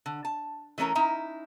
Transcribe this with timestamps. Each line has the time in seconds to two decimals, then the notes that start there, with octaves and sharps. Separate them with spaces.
0.06 D3
0.25 A5
0.78 E3 A3 C#4 A#4 A#5
0.95 C#4 D#4 E4 A#5